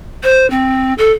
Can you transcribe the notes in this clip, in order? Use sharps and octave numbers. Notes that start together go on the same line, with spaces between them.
C5
C4
A4